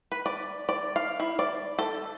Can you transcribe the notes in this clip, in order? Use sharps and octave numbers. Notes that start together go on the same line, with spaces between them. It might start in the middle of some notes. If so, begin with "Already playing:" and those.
B4
D5
D5
F5
E4
D5
A4